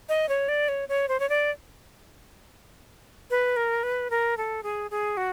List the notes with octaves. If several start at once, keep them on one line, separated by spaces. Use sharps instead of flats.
D#5
C#5
D5
C#5
C#5
C5
C#5
D5
B4
A#4
B4
A#4
A4
G#4
G#4
F#4